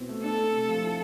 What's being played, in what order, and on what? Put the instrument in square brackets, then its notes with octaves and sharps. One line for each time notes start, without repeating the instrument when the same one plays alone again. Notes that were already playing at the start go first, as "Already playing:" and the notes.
Already playing: [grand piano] B2 C4 E4
A3
[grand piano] D4 [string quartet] A4
[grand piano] A3
C3
F3
E4